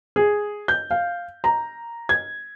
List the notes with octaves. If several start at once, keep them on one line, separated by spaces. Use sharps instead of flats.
G#4
G6
F5
A#5
G#6